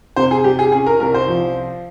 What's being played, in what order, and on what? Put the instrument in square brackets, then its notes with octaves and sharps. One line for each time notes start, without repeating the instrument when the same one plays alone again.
[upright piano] C3 C5
G#4
G3 G4
G#4
C#4 G#4
A#4
C2 A#4
C5
F3